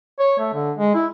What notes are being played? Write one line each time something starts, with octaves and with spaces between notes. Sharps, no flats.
C#5
A3
D3
G#3
E4